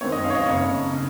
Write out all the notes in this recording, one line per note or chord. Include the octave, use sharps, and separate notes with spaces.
F#2 D#3 G#3 C4 C#5
D#5
F5
C#5
D#5
F#1 F2 C#3
C#3